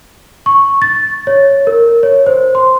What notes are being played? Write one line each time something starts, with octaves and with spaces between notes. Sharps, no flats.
C#6
A6
C#5
A#4
C#5
C5
C6